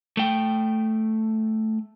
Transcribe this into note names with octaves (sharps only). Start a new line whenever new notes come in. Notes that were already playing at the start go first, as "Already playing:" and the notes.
A3 G5